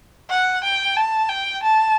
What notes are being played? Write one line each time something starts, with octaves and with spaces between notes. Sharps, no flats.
F#5
G5
A5
G5
A5